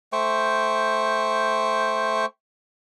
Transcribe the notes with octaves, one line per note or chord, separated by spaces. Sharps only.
A3 C5 G5 C#6